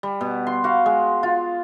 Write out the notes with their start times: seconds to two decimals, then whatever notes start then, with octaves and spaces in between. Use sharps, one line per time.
0.03 G3
0.21 B2
0.47 C6
0.64 F#4 F5
0.86 G#3
1.23 F4